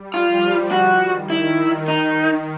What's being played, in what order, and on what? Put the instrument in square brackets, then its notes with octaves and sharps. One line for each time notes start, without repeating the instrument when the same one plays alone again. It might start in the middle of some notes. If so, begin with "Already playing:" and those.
Already playing: [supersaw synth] G3
[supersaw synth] F3 [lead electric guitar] F4
[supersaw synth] D3 [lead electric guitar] F#4
[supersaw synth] D#3
[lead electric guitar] E4
D#4